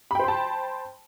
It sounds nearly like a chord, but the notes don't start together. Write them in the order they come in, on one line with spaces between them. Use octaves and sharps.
B5 G5 C5 C6 A5